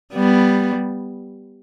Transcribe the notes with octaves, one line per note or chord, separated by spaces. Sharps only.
G3 B3